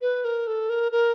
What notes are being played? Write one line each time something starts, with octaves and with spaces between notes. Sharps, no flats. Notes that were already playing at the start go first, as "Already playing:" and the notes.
B4
A#4
A4
A#4
A#4